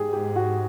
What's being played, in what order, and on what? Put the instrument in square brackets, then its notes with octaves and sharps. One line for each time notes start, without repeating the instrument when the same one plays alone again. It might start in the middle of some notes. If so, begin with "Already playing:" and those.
Already playing: [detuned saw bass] G#2 [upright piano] G4 G#4
[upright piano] G4
F#4